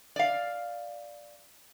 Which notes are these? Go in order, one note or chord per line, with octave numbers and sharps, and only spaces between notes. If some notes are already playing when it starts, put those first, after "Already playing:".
D5 F5